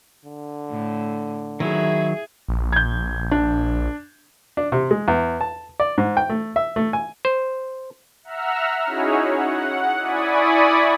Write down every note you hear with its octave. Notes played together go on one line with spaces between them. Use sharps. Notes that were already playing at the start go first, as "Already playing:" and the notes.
D3
A2
D#3 F#3 E4 G#4
A#1
G6 G#6
D4
D4
C3
G#3
E2
A5
D5
G#2
G5
A3
E5
A3
G#5
C5
E5 F#5 A#5 E6 F6
C#4 D#4 E4 F#4 G#4 C#5
F#5
E4 D5 G#5 B5 C#6 D#6